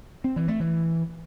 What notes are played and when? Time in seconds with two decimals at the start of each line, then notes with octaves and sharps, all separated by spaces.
0.24 C4
0.36 E3
0.48 A3
0.60 E3